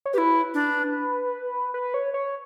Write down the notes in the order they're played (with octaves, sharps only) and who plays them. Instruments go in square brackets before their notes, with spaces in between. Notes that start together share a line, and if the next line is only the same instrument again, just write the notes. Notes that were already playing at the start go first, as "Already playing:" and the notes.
[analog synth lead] C#5
[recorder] E4 G4 [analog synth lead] B4
[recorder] D4
[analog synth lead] B4
C#5
C#5